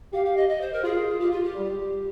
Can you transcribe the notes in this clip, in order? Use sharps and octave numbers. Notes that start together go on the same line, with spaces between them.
G4 F5
F5
D#5
D#5
C5
A#4
F4 G#4
F4 G4
F4
G4
G3